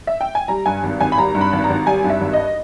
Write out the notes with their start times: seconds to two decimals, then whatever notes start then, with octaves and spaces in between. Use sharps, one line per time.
0.07 E5
0.21 G5
0.35 G#5
0.48 G3 A#5
0.66 G2 G#5
0.83 G#1
1.00 G#1 G#5
1.12 B5
1.18 G3 A#5
1.35 G2
1.41 B5
1.53 G#1
1.64 A#5
1.70 G#1
1.86 G3 G#5
2.04 G2
2.10 E5
2.21 G#1
2.33 D#5